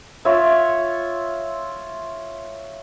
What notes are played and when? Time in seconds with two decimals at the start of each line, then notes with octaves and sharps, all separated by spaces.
0.25 F4 C#5 E5